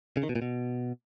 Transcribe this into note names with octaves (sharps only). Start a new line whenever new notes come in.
C#3
D#3
B2
A#2
B2